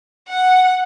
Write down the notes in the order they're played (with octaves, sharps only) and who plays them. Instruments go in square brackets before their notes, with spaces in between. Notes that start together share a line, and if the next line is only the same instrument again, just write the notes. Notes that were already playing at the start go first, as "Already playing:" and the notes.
[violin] F#5